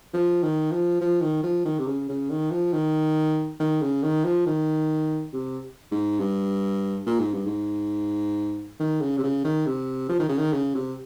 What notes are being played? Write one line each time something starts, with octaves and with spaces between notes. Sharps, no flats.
F3
D#3
F3
F3
D#3
F3
D#3
C3
C#3
C#3
D#3
F3
D#3
D#3
C#3
D#3
F3
D#3
C3
G#2
G2
A#2
G#2
G2
G#2
D#3
C#3
C3
C#3
D#3
C3
F3
D#3
C#3
D#3
C#3
C3